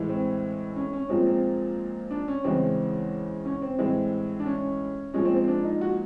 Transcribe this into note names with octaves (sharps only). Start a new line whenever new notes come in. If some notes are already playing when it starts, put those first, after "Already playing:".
Already playing: A2 E3 G#3
C4
C#4
C#4
A#2 F3 G#3 C4
C4
D4
C#4
E2 C#3 E3 G#3 C4
C#4
C4
A2 E3 G#3 C4
D4
C#4
A#2 F3 G#3 C#4
C4
C4
D4
D#4
F#4